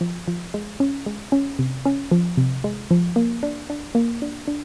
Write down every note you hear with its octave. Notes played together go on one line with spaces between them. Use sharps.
F3
F3
G#3
C#4
G#3
C#4
C3
C#4
F3
C3
G#3
F3
A#3
D4
D4
A#3
D4
D4